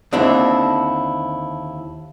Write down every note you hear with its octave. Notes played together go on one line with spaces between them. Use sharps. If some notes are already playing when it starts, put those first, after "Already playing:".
D#2 D3 C4 D4 E4